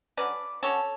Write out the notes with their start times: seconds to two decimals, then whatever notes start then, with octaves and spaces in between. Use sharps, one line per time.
0.17 D3 F#3 C#4 B4 D5
0.63 D3 F#3 C#4 A4 C#5